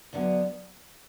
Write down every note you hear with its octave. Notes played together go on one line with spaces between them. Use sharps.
D2 D3 F#3 B3